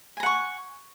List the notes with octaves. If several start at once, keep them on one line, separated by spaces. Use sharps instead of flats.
F#5 G#5 A#5 C#6